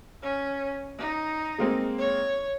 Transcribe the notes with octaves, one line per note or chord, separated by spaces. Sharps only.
C#4
D#4
G#3 A#3 C4
C#5